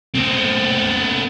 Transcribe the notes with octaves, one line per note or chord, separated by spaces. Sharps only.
B3 C4